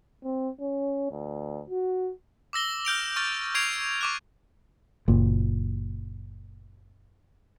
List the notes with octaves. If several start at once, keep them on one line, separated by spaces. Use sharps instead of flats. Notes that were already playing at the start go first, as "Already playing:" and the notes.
C4
C#4
D2
F#4
D6 E6 A#6 G7
F6 G6 D7 F7
C#6 F6 A6
C#6 G#6 C7 D7 F7
C#6 D6 F#6
F#1 A#2